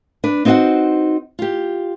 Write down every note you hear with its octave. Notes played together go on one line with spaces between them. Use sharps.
D4 B4
C4 D#4 E4 F#4 C5 F#5
F4 G4